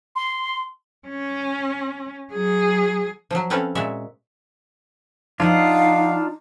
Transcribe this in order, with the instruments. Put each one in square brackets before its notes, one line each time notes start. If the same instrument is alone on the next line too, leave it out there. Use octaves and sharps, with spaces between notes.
[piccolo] C6
[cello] C#4
F#3 G#4
[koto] F3 F#3
C4 C#4 A4 B4 F5
A#2 G#3 F#4 E5
[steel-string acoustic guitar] F3 F#5 [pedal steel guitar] D4 F4 [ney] D#4 [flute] F5